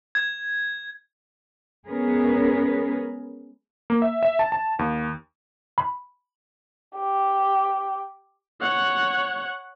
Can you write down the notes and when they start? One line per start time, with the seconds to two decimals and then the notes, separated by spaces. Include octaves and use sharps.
0.15 G#6
1.88 G#3 B3 C#4 G#4 A#4 B4
3.90 A#3
4.02 E5
4.23 E5
4.39 A5
4.52 A5
4.79 D#2
5.78 B5
6.97 G4
8.61 C#5 F#5